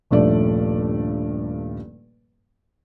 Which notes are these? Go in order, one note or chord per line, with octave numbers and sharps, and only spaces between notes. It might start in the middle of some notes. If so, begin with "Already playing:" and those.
D#1 G2 F3 A3 D5